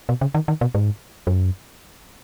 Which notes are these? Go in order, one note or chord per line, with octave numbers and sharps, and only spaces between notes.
B2
C#3
D#3
D#3
B2
G#2
F#2